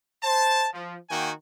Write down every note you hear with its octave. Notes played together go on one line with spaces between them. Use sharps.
C5 A5
F3
D#3 A#3 F#4 G5 G#5